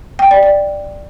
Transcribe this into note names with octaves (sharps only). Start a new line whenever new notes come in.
G5
D5
D5